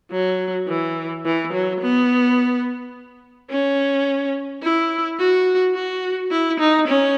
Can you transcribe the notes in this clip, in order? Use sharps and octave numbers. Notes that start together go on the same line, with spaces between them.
F#3
E3
E3
F#3
B3
C#4
E4
F#4
F#4
E4
D#4
C#4